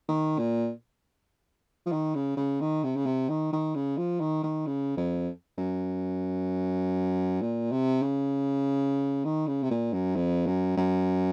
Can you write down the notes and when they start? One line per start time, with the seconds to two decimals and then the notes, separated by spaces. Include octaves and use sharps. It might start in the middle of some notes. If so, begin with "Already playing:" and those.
0.08 D#3
0.39 A#2
1.86 F3
1.92 D#3
2.15 C#3
2.37 C#3
2.61 D#3
2.84 C3
2.96 C#3
3.06 C3
3.29 D#3
3.53 D#3
3.75 C#3
3.97 F3
4.20 D#3
4.43 D#3
4.67 C#3
4.97 F2
5.58 F#2
7.42 A#2
7.72 C3
8.02 C#3
9.25 D#3
9.47 C#3
9.63 C3
9.71 A#2
9.93 F#2
10.16 F2
10.46 F#2
10.77 F#2